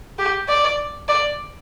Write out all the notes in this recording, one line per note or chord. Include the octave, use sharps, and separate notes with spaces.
G4
D5
D5